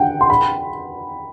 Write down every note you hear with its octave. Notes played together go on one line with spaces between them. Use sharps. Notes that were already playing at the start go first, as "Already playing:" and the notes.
Already playing: F#5 G5
C6
B5